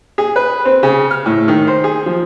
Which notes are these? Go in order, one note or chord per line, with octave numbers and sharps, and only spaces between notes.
G#4
B4
C4
C#3
F6
A2
D#3
C5
G#4
F3